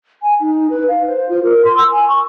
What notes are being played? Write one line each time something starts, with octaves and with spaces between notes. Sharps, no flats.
G#5
D#4
B4
F5
C5
F4
A#4
C6
E6
G#5
C#6